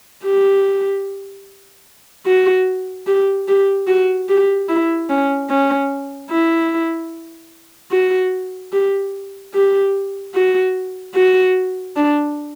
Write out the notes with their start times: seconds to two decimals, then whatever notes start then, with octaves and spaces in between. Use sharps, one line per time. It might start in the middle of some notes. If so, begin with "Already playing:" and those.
0.24 G4
2.26 F#4
3.07 G4
3.48 G4
3.87 F#4
4.29 G4
4.69 E4
5.10 C#4
5.50 C#4
6.30 E4
7.92 F#4
8.72 G4
9.54 G4
10.34 F#4
11.15 F#4
11.96 D4